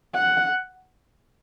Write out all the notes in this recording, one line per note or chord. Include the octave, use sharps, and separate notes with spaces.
F#5